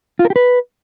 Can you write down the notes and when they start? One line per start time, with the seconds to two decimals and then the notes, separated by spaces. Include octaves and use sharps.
0.19 F4
0.25 A#4
0.30 G4
0.36 B4